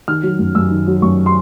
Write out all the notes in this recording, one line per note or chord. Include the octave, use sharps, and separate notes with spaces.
D#3 F6
F#3
F#2
F#2 E6
D#3
F#3
F#2 C#6
C6